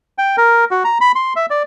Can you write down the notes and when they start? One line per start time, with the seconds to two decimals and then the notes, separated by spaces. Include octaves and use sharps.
0.18 G5
0.37 A#4
0.71 F#4
0.84 A#5
1.01 B5
1.15 C6
1.36 E5
1.50 D5